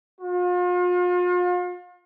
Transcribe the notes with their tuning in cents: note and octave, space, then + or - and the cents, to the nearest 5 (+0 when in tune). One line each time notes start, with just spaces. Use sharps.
F4 +40